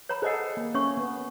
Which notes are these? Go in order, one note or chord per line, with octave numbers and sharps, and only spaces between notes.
C#5 A#5 B5
G#4 A4 C5 D#5 F#5
A#3
C#4 C#5 E5 C#6
B3